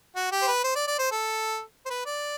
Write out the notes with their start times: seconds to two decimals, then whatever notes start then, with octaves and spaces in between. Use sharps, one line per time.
0.16 F#4
0.32 G4
0.42 C5
0.48 B4
0.64 C5
0.76 D5
0.88 D5
0.99 C5
1.12 A4
1.86 C5
1.90 B4
2.06 D5